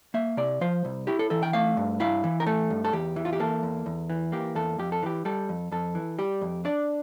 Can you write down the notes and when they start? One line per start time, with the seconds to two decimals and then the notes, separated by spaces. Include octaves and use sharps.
0.14 A#3 E5
0.37 C3 D5
0.61 F3 C5
0.85 C2
1.07 E4 G4
1.19 A4
1.30 E3 A4
1.43 G5
1.53 A3 F5
1.77 G2
2.00 E4 F5
2.24 E3
2.40 A#4
2.46 A3 A4
2.70 G2
2.85 A4
2.93 E2 G4
3.16 E3
3.25 F4
3.33 G4
3.40 A#3 A4
3.63 E2
3.86 E2
4.10 E3
4.32 A#3 G4
4.55 E2 A4
4.78 F2 G4
4.92 A4
5.03 E3 G4
5.25 G3 A4
5.49 F2
5.72 F2 A4
5.95 E3
6.19 G3 G4
6.41 F2
6.65 D4 D5